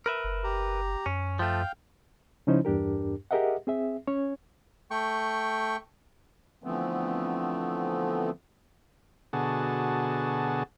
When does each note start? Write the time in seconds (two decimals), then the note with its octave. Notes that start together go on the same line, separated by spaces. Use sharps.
0.06 A#4 B4 E5
0.24 F#1
0.44 G4 A#5
1.06 F#2 C#4
1.39 F3 A3 F5 G5
2.47 C#3 F3 C#4 D#4 E4 C5
2.65 E2 G2 D4 G4 A#4
3.31 G4 G#4 A#4 D#5 E5 F#5
3.67 C4 G#4 E5
4.07 C#4 C#5
4.91 A3 G5 C#6
6.64 D3 E3 F3 A3 B3 C4
9.33 B2 D3 F#4 G#4 A5